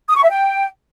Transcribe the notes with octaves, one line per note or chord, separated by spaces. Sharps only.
D#6
C#6
E5
G5